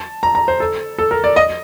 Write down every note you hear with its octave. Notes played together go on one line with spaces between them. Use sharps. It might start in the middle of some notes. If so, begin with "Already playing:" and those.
Already playing: A5
A#5
A#5
C5
A4
A4
A#4
D5
D#5